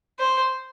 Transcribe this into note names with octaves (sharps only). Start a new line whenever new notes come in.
C5